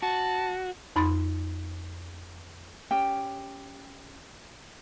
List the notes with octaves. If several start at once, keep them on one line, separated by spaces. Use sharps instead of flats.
F#4 A5
F2 D#4 B5 C6 A6
C#4 G4 G5